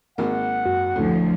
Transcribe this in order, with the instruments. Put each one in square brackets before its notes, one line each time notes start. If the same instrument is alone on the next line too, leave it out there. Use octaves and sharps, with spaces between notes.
[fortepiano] G#1 A#3 [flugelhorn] F#5
[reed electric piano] F#2 F#4
[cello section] D2 F3 [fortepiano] A2 D3